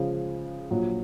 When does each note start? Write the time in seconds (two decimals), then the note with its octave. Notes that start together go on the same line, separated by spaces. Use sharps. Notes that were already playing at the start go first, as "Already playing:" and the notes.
Already playing: C#3 F3 G#3
0.71 A#1 A#2 F#3